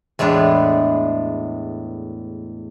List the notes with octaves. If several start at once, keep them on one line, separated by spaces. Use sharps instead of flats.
E2 A2 G#3 D4 B4